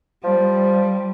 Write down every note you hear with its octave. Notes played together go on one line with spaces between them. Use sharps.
F3 G3